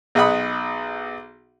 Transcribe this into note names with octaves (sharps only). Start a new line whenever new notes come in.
B1 G#4 D#5 F#5 B5 D#6